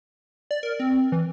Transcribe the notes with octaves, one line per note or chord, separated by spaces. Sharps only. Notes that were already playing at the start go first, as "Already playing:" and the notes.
D5
A#4
C4
E3